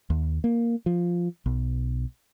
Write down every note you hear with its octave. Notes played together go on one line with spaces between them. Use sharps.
D#2
A#3
F3
B1